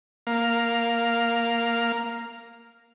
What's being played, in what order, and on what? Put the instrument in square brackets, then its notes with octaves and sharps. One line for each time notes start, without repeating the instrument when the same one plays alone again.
[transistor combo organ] A#3 F5